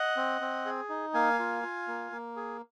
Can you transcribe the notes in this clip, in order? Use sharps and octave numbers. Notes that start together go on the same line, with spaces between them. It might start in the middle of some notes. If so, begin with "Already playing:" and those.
Already playing: D#5 F#5
C4
C4
G#4
D#4
A#3 F5 G#5
F4
F4
A#3
A#3
G#4